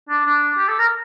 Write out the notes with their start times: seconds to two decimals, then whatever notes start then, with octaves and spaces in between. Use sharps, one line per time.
0.09 D4
0.26 D4
0.58 G4
0.68 A4
0.79 A#4